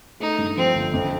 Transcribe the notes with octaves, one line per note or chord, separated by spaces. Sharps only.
A3 D#4
G2
F3 C4
G1
F2